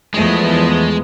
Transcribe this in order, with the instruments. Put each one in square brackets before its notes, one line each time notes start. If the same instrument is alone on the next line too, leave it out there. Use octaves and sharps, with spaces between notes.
[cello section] E2 A3 [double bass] F3 B3 [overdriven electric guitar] G#3